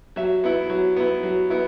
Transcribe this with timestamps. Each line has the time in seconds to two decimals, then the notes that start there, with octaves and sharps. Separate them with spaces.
0.16 F#3 E5
0.44 B3 E4
0.70 F#3
0.97 B3 E4
1.23 F#3
1.50 B3 E4